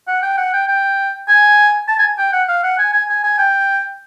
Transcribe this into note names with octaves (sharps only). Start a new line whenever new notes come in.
F#5
G5
F#5
G5
G5
G#5
A5
G#5
G5
F#5
F5
F#5
G#5
G#5
G#5
G#5
G5